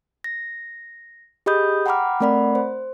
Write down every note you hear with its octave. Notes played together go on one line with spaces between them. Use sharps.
A#6
G4 G#4 D#5 B5 D#6 G6
F#5 G5 A#5 B5 D6 F6
A3 C4 A#4 D5 F#5 B5
C5